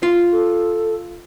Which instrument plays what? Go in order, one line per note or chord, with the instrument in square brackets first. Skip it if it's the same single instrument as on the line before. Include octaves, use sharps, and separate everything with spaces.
[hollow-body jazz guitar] F4
[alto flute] A4